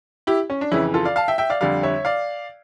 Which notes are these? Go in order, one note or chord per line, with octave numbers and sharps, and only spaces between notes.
E4 G4
C#4
D4
F2 C#3 E3 C#4 E4
F4 A4
D5 F5
F5 A5
E5 G5
E5 G5
D5 F5
F2 D3 G3 D5 F5
C#5 E5
D5 F5